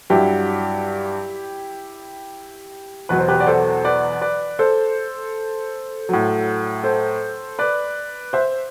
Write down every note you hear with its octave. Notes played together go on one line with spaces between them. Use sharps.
G2 F#3 E4 G4
E2 B2 F#3 B4
C5
G4 B4
D5
A4 C5
B4 D5
B4 D5
A4 C5
A2 F#3
A4 C5
B4 D5
C5 E5